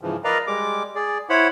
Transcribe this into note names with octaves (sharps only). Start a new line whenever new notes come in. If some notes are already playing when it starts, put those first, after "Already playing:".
G#2 C#3 E3 F3
A#4 B4 D5 D#5 F5 A#5
G3 G#3 D6
G#4 D5
E4 C5 C#5 F#5 B5